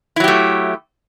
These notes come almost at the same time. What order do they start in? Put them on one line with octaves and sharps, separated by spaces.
E4 F#3 G4 A3